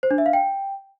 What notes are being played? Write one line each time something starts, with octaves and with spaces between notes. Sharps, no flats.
C5
D4
E5
F5
G5